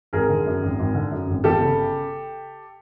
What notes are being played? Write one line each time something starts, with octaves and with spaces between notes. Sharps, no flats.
G#1 G#4 A#4
D3
F#2
G#1
G#1
D3
F#2
G#1
G1 G4 A4
C#3